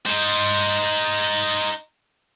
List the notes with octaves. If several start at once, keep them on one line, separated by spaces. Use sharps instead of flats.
D#4 C5